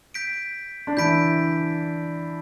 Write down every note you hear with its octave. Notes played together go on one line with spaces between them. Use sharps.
G6 B6 D7
D4
E3 E4 G6 B6 D7